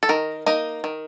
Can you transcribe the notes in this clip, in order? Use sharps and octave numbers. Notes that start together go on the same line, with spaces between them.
A4
D#3 A#4
A#3 D#4 D#5
D#3